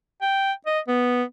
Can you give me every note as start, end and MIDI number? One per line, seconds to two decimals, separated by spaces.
0.22 0.52 79
0.66 0.79 75
0.88 1.23 59